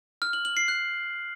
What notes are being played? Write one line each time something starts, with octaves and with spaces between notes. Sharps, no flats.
F6
F#7
F#7
C7
F#6